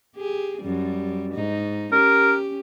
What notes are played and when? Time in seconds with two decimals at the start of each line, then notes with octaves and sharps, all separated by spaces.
0.16 G4 G#4
0.61 F#2 G3
1.33 G#2 D#4
1.92 C#4 G4 A#4